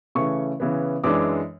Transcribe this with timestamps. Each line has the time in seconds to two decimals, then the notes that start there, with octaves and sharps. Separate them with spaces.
0.15 C#3 E3 A3 C#6
0.60 C#3 E3 B3
1.03 F#2 E3 G#3 D4 D6